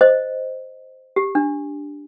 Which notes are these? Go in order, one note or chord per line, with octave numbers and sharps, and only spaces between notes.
C5 D#5
G4
D4